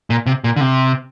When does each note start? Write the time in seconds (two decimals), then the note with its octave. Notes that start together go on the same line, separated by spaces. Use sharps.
0.10 A#2
0.26 C3
0.44 A#2
0.56 D3
0.61 C3